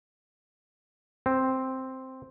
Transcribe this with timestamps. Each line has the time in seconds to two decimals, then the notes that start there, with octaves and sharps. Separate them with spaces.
1.26 C4